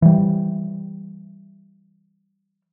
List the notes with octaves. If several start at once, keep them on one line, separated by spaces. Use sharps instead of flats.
E3 G3